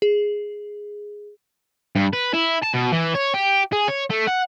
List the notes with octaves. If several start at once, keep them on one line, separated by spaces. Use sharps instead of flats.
G#4
G2
B4
E4
A5
B2
E3
C#5
G4
G#4
C#5
A3
F#5